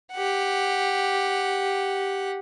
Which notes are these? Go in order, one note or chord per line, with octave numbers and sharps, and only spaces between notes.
G4 F#5